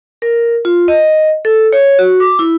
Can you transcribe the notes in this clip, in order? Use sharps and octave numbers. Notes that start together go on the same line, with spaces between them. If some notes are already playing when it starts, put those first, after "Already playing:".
A#4
F4
D#5
A4
C#5
F#4
D6
E4